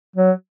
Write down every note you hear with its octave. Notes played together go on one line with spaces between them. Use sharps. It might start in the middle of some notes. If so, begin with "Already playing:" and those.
F#3